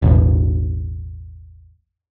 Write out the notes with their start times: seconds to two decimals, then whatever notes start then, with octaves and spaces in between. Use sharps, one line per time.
0.02 E1 A1